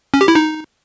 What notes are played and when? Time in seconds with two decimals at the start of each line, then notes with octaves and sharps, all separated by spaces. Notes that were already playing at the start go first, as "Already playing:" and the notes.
0.14 C#4
0.21 G4
0.28 E4
0.35 D#4